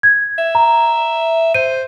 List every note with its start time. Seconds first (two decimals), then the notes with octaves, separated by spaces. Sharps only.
0.03 G#6
0.38 E5
0.55 A#5
1.54 C5 D#7